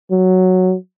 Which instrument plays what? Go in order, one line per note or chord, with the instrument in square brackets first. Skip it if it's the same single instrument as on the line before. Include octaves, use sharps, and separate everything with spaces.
[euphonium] F#3